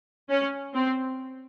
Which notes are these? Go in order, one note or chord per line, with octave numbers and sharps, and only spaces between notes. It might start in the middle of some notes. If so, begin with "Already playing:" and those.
C#4
C4